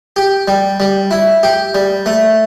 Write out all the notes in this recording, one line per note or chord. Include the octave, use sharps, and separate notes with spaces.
G4
G3
G3
E4
G4
G3
A3